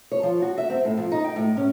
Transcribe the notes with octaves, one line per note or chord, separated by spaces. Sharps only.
C#5
F3
F#4
E5
C4
A2
F2
D#4
G5
A2
C#4